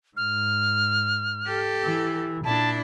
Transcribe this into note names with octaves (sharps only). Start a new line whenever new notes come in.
G#2 F6
G4 A4
E3
A#2 D4 E4 A5